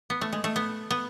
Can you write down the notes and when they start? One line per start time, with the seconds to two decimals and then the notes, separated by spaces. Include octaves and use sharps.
0.10 B3
0.21 A3
0.33 G#3
0.44 A3
0.56 B3
0.91 B3